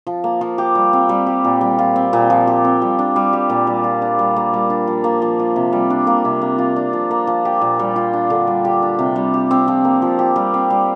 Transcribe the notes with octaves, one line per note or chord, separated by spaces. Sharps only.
F3
A#3
F3
G4
G3
C4
G3
G4
A#2
G3
F4
C4
A#2
F3
G4
C4
G3
D4
G3
G4
A#2
G3
F4
D4
G3
A#3
G3
D4
F3
A#3
F3
F4
C3
G3
D4
A#3
C3
A#3
F4
D4
F3
A#3
F3
G4
A#2
G3
F4
D4
D3
G3
G4
D4
C3
G3
G4
C4
F3
A#3
F3
G4
G3
C4
G3